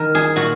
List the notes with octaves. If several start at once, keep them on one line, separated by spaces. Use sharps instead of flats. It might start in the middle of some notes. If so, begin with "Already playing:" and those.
Already playing: D#3 A#4 D#5
G#4
A#2 F#4